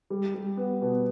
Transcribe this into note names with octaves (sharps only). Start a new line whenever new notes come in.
G3
G3
B3
B2